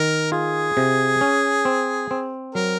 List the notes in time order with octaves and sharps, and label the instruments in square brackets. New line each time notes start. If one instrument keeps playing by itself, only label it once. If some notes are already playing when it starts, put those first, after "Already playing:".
Already playing: [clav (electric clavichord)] D#3 [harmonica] A#4
[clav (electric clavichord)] F4 [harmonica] G#4
[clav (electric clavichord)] C3
C#4
C4
C4
[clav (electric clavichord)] F#3 [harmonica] A#4